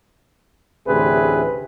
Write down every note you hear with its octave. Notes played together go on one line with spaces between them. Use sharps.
A1 D2 C3 G#4 B4